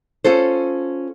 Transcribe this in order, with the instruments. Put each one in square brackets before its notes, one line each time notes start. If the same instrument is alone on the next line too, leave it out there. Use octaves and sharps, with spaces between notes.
[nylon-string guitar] C#4 F4 A4 C5